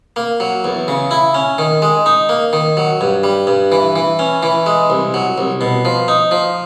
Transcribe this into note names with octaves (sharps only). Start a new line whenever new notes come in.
A#3
F#3
E2
C#3
E4
C#4
D#3
G#3
D#4
A#3
D#3
F#3
G2
G3
G2
E3
E3
C#4
E3
G#3
C2
F#3
C2
B2
F3
D#4
F3